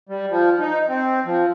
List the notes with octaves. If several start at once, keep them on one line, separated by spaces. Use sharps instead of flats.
G3
F3
D#4
C4
F3